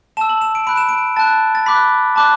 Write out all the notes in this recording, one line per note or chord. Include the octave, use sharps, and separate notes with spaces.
A5 E6 E7
F#7
E7
D7
B5 F#6 D7
E7
D7
A5 F#6 A6
A6
B5 D6 F#6 B6
A5 D6 F#6